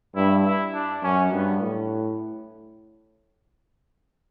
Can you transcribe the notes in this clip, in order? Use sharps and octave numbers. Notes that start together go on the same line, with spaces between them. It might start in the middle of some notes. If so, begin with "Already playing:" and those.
G2 E4
E4
D4
F#2 C#4
G2 B3
A2